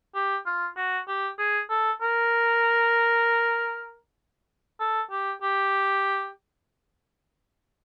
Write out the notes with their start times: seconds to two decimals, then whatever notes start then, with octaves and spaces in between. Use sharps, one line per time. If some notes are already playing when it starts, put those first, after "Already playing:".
0.15 G4
0.46 F4
0.77 F#4
1.08 G4
1.39 G#4
1.70 A4
2.01 A#4
4.80 A4
5.11 G4
5.42 G4